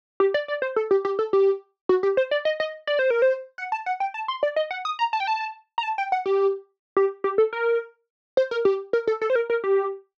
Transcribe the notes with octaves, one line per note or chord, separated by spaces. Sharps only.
G4
D5
D5
C5
A4
G4
G4
A4
G4
F#4
G4
C5
D5
D#5
D#5
D5
C5
A#4
C5
F#5
A5
F#5
G5
A5
C6
D5
D#5
F#5
D#6
A#5
A5
G5
A5
A#5
A5
G5
F#5
G4
G4
G4
A4
A#4
C5
A#4
G4
A#4
A4
A4
C5
A#4
A#4
G4